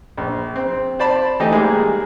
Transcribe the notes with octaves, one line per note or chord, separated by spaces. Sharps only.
A#1
C4
C5 D5 A5 B5
E3 A3 D#4 G4
G3 G#3 A#3 G#4